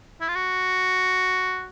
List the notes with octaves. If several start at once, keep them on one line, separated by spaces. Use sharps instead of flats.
E4
F4
F#4